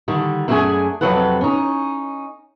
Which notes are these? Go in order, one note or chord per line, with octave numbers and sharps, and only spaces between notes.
D3 D#3 G3
F#2 A3 D4 F#4 G#4 G#5
F2 C3 F#3 A4 B4 F#5
C#4 D#4